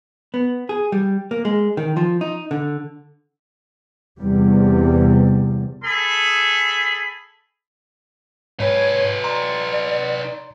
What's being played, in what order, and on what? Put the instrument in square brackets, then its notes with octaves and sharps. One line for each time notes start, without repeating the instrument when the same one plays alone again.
[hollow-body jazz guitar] B3
G#4
G3
A#3
G#3
D#3
F3
D#4
D3
[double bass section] E2 C3 G3
[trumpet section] G#4 A4 B5
[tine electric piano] G#2 [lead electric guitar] D#4 B4 [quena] C#5
[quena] D5 [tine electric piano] A#5 C6